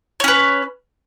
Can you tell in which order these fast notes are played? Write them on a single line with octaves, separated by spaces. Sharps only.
C#5 C#4 B4